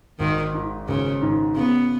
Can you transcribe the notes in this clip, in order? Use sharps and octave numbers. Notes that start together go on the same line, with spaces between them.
G#1 D#3
G#2 D#3
G#1 C#3
G#2 D#3
C#3 B3